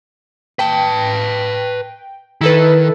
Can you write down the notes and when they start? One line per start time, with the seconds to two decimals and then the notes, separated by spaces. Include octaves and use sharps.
0.59 B4 G5 A5
2.41 D#3 E4 A4 B4